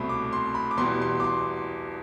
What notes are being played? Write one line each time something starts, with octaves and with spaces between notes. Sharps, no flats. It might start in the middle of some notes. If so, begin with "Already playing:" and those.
Already playing: C2 B2 A3 C4 B5
D6
C6
B5
D6
E2 B2 G3 C6
C6
D6
C6